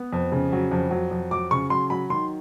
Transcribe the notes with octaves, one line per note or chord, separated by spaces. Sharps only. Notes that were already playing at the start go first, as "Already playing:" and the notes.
Already playing: B3
F2
C#3
F#3
F2
F#3
F2
F#3 D6
C#3 C#6
F#3 C6
F#3 B5
D#3 C6